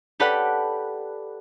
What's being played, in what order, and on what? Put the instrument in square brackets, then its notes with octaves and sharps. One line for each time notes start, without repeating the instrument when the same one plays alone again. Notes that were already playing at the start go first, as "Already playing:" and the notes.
[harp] G4 A4 B4 D5 F#5 F#6